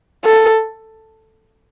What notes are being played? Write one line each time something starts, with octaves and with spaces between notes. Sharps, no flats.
A4